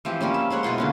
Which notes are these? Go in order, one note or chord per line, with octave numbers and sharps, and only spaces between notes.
E3 F3 C4 G4
F3 G3 A#3 C#4
E5
G#3 C5 C#5 F#5
B2 E4 F4 C6
D3 A#3 C#4